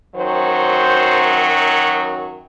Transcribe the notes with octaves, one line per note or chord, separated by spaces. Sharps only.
F#2 D#3 F#3 C5